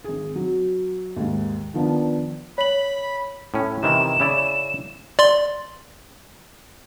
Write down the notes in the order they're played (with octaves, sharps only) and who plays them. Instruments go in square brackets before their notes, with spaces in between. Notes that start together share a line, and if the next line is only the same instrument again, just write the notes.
[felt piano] G#1 G#4
F#3
D#2 G#2
D#3 F3 B3 D4
[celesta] C#5 F#7 [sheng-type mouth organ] B5
[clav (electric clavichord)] A2 C#4
[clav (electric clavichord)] C3 D#3 E3 [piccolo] E7
[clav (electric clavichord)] C#3 E4 D5
[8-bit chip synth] D5 C6